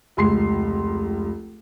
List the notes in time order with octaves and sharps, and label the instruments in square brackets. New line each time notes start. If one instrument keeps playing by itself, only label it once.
[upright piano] F1 C#2 C6 C7